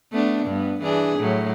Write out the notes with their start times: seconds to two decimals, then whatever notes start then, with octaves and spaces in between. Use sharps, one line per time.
0.12 A3 B3 D4
0.46 G2 B3
0.83 E3 D4 G#4
1.19 A2 F#3